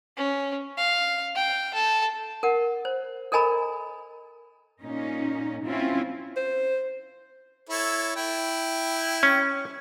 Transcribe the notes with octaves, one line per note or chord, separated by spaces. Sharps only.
C#4
F5
G5
A4
A#4 F#5
C5
A4 A#4 D#5 G#5 A#5 B5
A#2 C#4 D#4
C4 C#4 E4 F4
C5
E4 A4 C#5
E4 G5
C#4